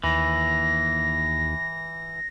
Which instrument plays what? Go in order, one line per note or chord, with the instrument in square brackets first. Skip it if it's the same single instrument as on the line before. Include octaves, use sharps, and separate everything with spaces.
[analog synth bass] D#2 [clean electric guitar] E3 [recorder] A#6